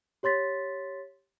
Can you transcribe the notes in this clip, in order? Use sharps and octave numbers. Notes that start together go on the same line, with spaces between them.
G4 C#5 C6 A6 B6